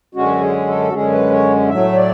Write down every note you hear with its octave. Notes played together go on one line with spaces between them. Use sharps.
F#2 D3 G#3 C#4 F#4
G#4
A4
F#4
F#2 D3 G#3 C#4 G#4
B4
C#5
A2 F#3 A3 E5
C#5
D5